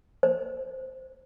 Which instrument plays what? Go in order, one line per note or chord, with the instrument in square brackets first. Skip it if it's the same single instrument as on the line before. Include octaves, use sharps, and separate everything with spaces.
[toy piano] C5